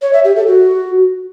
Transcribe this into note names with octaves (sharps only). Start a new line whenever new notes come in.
C#5
E5
G4
A4
F#4